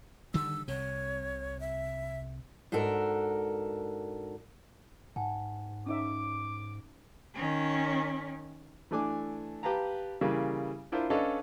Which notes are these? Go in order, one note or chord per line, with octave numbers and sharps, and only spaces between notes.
D3 D#3 G3 E6
C2 C3 C#5
E5
G#2 D4 F#4 A4 A#4
G#2 F#5 G#5 A5
C#4 D#4 E5 D6
D#3 C#4
E3 A3 D4 G#5 D6
G4 B4 F5 A5 A#5
C#3 E3 G3 A#3
D4 E4 F4 A#4 C5
C#4 D4 A4 B4 D#5 F5